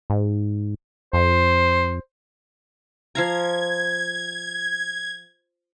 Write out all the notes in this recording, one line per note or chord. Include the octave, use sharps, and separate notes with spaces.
G#2
F2 C5
F3 F5 A#5 G#6